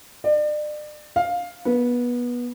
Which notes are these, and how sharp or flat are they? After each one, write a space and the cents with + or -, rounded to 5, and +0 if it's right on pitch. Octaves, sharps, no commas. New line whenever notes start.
D5 +35
F5 +10
B3 -20